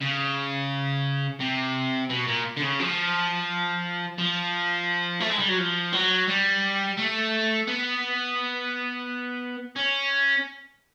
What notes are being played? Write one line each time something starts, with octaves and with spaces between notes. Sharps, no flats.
C#3
C3
B2
A#2
D3
C#3
F3
F3
A3
G#3
G3
F#3
F3
F#3
G3
A3
B3
C#4